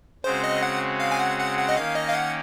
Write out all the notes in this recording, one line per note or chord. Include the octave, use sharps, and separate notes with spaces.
C#3 G#3 C4 F#4 C5
D#5
F#5
F5
G#5
F#5
F#5
F#5
D#5
D#3 A#3 C#4 F5
D#5
F5
F#5